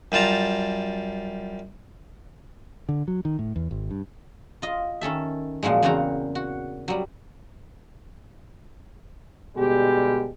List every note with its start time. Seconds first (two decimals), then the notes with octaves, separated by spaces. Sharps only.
0.12 F#2 G3 F4 A5 A#5
2.89 D3
3.08 F#3
3.25 D#3
3.39 A2
3.56 E2
3.71 G#1
3.91 G2
4.62 F4 D#5
5.01 D#3 C#4 A4 E5
5.63 A#2 F3 F#3 G#3
5.82 E2 A#2 C#3 C4 F#4 A#5
6.35 F#4
6.88 F#3 G3
9.56 B2 D3 G3 G#3 G4